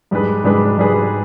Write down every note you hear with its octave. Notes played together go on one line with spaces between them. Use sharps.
G#2 G3 D4 G#4 B4
G#2 G3 D4 G#4 B4
G#2 G3 D4 G#4 B4